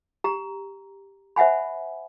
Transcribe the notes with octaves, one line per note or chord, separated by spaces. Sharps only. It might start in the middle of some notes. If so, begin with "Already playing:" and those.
G4 A#5
C5 E5 F#5 G#5 B5